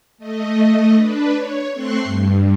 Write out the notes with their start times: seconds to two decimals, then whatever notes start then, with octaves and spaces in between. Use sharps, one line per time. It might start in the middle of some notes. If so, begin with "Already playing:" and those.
0.18 A3 D#5
0.95 D4 B4
1.35 C#5
1.73 A3 C4 C6 C#6 F#6 C7
2.04 G2